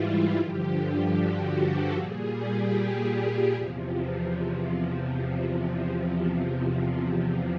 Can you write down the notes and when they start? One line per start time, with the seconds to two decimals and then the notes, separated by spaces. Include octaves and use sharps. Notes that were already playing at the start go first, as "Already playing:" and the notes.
Already playing: G#2 E3 G3 E4 F4
0.35 G2 D3 F3 G4
0.76 G4
1.14 F#4
1.54 A4
1.94 A#2 G3 G#4
2.34 G4
3.53 E2 C3 F3